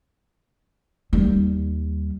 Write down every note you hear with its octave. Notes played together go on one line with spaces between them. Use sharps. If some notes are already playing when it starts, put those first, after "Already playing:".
D#2 G3